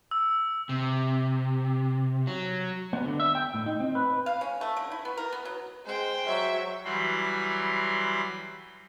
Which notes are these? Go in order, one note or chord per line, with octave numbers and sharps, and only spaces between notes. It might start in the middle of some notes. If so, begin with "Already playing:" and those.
E6
C3
F#3
B3
D3
E5
G5
A2
D#4
C4
B4
F5
C#4
A3
D3
E4
B3
A#4
B3
F#3
G#3 C5 G5
F#3 E5
E3 F#3 G3 B5 C6